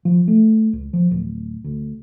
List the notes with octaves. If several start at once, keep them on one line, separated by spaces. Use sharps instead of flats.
F3
A3
C#2
F3
D1
D2